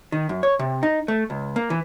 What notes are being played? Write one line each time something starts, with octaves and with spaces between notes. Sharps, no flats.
D#3
F#2
C#5
C3
D#4
A3
C#2
A#3
E3